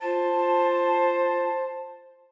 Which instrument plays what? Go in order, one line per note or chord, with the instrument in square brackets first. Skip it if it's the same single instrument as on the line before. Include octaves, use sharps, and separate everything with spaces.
[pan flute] F4 [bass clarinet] C5 [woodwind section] A5